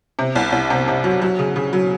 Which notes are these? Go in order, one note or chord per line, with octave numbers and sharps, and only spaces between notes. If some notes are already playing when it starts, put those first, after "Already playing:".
C3
C2
C2
C3
C3
F#3
F#3
C#3
C#3
F#3